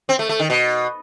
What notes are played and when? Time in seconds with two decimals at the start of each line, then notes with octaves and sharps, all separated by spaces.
0.09 C4
0.19 A3
0.29 A3
0.40 D#3
0.50 B2